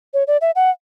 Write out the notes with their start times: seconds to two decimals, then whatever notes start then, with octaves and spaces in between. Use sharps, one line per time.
0.14 C#5
0.27 D5
0.41 E5
0.55 F#5